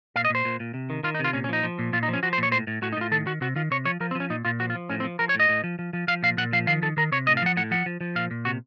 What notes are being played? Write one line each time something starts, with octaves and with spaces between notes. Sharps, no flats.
A#2 F5
D#5
A#2 C5
A#2
A#2
C3
D#3
D#3 F4
D#4
C3 F4
A#2 C#4
C#4
F3 D#4
F3
A#2
A#2 F4
D#4
F3
C#4
F3 F#4
C5
A#2 C#5
A2 C5
A2
A2 F#4
D#4
A2 F4
D#3 A4
D#3 F#4
C3 F#4
D#3 F4
C3 C#5
F3 C#5
F3 A#4
C4
F3 C#4
A#2 D#4
A#2 F4
F3 F#4
F4
F3
A2 C#4
C4
F3
F3 A#4
C#5
A2 D#5
A2
F3
F3
F3
F3 F5
A#2 F5
A#2 F#5
F3 F5
D#3 F5
D#3 A4
D#3 A#4
C3 C#5
A2 D#5
F5
F3 F#5
A2 F#5
F3 F#5
F3
F3
A#2 F5
A#2
C3 F#4